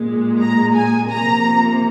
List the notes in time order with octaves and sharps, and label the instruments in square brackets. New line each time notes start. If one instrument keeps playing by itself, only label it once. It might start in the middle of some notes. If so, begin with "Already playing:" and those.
Already playing: [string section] A#2 G#3
A#5
G#5
C3 F3 A#3 A#5